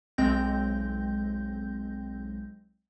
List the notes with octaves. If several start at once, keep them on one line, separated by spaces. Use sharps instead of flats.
B1 G#3 C4 G6 A#6